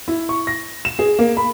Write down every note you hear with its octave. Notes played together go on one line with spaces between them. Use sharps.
E4
C#6
A#6
E7
G#4
A#3
B5